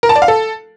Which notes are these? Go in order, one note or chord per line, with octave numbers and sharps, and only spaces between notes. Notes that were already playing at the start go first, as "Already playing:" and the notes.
A#4
A5
D5
F5
A4